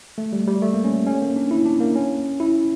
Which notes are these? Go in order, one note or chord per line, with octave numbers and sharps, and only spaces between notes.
A3
G3
G3
A3
A#3
C#4
C#4
A#3
D4
E4
D4
A#3
C#4
E4